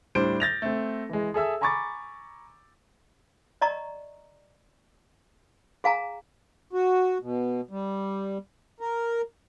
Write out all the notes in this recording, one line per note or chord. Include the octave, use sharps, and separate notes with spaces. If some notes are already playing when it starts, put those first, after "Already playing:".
A2 G3 D4 C5 D7
G6 A6 A#6 F7
A3 C4
E3 G#3
G#4 A4 E5 E6
G#5 A#5 B5 C#6 D6 A6
D5 D#5 A#5 C#6
G#4 F5 G#5 A#5
F#4
B2
G3
A#4